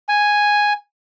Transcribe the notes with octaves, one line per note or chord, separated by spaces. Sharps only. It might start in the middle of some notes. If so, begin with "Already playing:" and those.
G#5